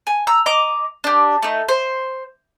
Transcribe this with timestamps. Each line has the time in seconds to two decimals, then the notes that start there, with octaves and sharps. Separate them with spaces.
0.07 G#5
0.27 A#5 E6
0.46 D#5 A#5 D6
1.04 D4 G4
1.43 A3 D#4
1.68 C5